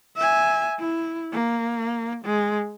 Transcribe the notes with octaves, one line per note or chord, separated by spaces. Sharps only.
E5 G#5
E4
A#3
G#3